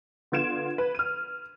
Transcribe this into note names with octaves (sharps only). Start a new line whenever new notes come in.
D3 B3 F4 G#6 D7 E7
B4
F6 D#7